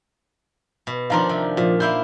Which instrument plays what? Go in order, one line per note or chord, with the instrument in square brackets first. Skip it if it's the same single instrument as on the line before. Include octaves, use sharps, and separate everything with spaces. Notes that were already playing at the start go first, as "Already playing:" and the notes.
[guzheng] B2
[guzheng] D#3 F3 D4 [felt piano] F5 A#5 C6
[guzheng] C3
[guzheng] A#2 [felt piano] F3
[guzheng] A#3 E4 C6 [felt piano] G6